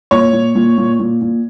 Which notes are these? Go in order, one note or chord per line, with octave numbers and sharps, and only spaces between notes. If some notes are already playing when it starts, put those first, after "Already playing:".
A#2 C#5
A#2
A#2
A#2
A#2
A#2